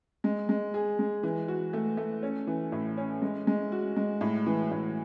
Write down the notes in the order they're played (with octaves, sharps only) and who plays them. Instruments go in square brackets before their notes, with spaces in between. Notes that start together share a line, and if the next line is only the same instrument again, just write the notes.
[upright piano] G#3
G#3
G#4
G#3
E3
F#4
A3
A3
C#4
E3
A2
C#4
G#3
G#3
F#4
G#3
A2
E3
A2